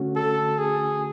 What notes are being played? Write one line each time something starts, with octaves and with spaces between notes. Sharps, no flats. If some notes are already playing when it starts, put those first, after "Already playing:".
Already playing: D3 A3 C#4 F#4
A4
G#4